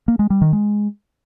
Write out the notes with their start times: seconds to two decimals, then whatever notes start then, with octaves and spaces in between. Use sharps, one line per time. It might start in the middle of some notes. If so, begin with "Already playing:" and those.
0.08 A#3
0.19 G#3
0.30 G3
0.42 D#3
0.53 G#3